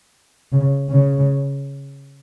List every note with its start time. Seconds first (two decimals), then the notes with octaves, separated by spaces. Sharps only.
0.52 C#3
0.89 C#3